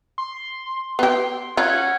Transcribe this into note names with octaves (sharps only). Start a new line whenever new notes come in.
C6
B3 G4 C6
C#4 F4 F#5